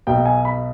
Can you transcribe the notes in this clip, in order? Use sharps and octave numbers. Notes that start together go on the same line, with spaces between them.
B1 B2 G5
G#5
B5